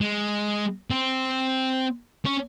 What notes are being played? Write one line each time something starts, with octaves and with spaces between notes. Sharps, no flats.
G#3
C4
C#4